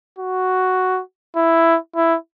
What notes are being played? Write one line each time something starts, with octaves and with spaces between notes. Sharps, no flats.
F#4
E4
E4